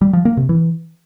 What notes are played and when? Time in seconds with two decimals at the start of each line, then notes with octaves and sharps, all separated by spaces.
0.01 G3
0.13 F3
0.25 A#3
0.37 C3
0.49 E3